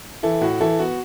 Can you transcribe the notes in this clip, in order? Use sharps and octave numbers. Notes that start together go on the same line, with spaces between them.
E3 E4 A4
A2 F#4
E3 E4 A4
B3 F#4